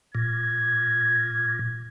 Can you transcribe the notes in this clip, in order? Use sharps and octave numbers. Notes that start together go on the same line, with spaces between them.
A#2 G#6